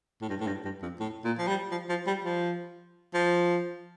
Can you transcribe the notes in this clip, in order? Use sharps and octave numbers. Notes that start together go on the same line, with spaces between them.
A2
G2
A2
G2
G2
F2
A2
A#2
F3
G3
F3
F3
G3
F3
F3